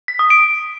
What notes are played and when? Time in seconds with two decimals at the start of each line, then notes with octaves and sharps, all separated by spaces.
0.08 B6
0.19 D#6
0.30 D7